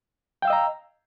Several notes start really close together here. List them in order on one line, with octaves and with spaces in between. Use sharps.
G5 F5 E6 D#5 A#5